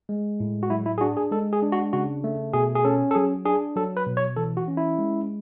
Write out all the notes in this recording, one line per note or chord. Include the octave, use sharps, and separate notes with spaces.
G#3
A2
F#4
F#3 E4
E4
G#4
D4 F#4
G#4
G#3 A4
G#4
D4
F#4
C#3 F#4
A3
B2 G#4
G#4
C#4 A4
A4
F#3 G#4
D4 G#4
F#3 A4
B4
B2
C#5
E3 A4
F#4
C#4
E4
G#3